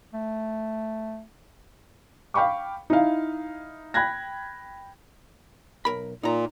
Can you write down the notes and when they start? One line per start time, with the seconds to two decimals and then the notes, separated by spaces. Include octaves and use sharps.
0.14 A3
2.34 F5 G5 B5 C#6 D6
2.90 D#4 E4 F5
3.94 G5 B5 F#6 G#6 A#6
5.85 B1 A#4 B5
6.23 A#2 D#4 A#5